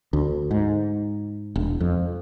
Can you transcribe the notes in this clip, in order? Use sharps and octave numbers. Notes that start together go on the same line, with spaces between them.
D2
G#2
E1
F2